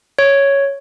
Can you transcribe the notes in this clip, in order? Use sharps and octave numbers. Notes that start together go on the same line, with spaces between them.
C#5